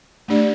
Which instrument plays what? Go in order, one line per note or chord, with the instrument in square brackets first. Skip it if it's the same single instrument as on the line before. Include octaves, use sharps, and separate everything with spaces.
[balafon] A3 D4 G4 D5